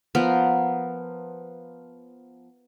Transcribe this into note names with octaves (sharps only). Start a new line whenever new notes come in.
F3 B3 A#4